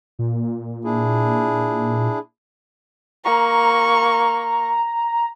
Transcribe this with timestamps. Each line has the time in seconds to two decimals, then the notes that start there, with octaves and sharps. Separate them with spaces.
0.19 A#2
0.85 D4 E4 G#4
3.25 A#3 A#5 C#6